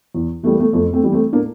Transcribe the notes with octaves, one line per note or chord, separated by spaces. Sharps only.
E2
E3 G3 A3
A#3
A3
F2 A3
A3 C4
E3 G3
A3 C4
A2 A#3 D4